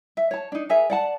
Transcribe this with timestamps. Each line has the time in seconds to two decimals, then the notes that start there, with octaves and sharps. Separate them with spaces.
0.17 E5
0.31 C#5 A5
0.52 D4 D#4
0.69 G#4 A#4 E5 G#5
0.90 D5 F#5 A5